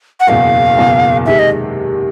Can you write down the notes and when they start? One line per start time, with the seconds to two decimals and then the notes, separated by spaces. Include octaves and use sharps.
0.20 F#5
0.27 F#1 E2 B2 F5
0.77 F#1 E2 B2
1.26 C3 D#3 G#3 E5
1.39 D#5